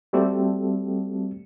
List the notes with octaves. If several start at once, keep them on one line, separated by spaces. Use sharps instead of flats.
G3 A3 C4 F#4 G4 A4